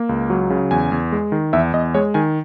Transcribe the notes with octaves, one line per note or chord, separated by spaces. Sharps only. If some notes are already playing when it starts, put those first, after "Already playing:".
Already playing: A#3
C#2
F#3
C#3
E2 G#5
E2
G#3
D#3
E2 E5
E2 D#5
G#3 C#5
D#3 G#5